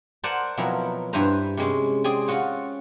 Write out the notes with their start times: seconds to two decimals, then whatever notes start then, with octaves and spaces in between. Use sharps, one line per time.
0.24 A#4 C5 D5 F#5 G#5 A5
0.57 B2 F3 F#3 C4 E4 A#4
1.13 G2 E4 B4 C5 A#5
1.57 C3 G#3 C#4
2.04 C4 G#4 D5 G#5
2.28 C#4 F4 F#4 C#5